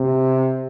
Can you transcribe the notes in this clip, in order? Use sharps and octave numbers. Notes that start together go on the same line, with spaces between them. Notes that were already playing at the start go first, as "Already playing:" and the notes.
Already playing: C3